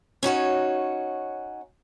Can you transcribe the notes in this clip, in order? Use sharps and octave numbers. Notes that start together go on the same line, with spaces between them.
C#4 D#4 F#4 C#5